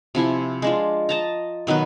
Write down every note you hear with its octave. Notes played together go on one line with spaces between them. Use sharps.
C3 F3 E4 G#5
G#3 D4 F4
D#5 A5 A#5
B2 D#3 F#3 B4